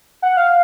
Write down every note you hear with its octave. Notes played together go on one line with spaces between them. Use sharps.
F#5
F5